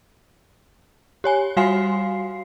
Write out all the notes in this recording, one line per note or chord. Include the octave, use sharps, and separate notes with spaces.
G4 C#5 G#5
G3 F#4 F5 G#5 C6 C7